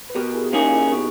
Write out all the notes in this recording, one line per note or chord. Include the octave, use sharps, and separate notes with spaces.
B4
B2 G4 A#4
E4 G#4
A#3 C#4 D#4 G4 G#4
D#4
E4
B2